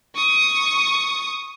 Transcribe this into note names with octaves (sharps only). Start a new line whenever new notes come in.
C#6 D#6